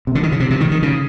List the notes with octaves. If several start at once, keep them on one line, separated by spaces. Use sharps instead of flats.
C3
D3
D#3
C#3
C3
C3
D#3
D#3
C#3